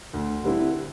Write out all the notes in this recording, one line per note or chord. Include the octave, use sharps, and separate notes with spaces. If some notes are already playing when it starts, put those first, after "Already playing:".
D2
D3 G3 C4 E4